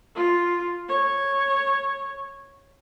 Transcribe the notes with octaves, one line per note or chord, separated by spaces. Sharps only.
F4
C#5